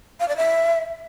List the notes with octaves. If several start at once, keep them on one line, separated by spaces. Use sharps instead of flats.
F5
D5
E5